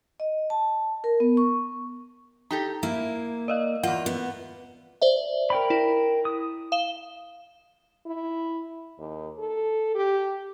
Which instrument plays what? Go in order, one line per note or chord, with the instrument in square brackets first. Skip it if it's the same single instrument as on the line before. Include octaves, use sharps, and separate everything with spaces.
[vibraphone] D#5
A5
A#4
B3
C#6
[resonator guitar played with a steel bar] D#4 G4 A4 [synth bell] A#5
[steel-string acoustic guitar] A#3 [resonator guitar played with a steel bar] E4
[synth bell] D5 D#5 F5
[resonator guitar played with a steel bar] E2 A#3 [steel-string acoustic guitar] F4 [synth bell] F#5
[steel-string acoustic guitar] B3
[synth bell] C5 D5 E5
[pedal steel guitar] A#4 G5 B5
[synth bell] E4
[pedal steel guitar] D#6
[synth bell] F5 E7 G7
[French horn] E4
D#2
A4
G4